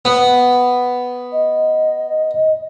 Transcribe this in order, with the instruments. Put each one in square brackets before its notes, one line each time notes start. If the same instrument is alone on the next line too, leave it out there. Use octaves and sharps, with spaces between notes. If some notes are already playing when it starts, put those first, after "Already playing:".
[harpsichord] B3
[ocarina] D#5